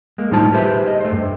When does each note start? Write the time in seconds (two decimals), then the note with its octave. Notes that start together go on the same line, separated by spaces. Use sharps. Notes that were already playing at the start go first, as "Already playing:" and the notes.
0.18 G#3 A#3
0.31 A2 G3 D#4 F4 C5 A5
0.53 G4 G#4 B4 C5 D#5 E5
0.87 D#5
1.01 A3 C5
1.12 G2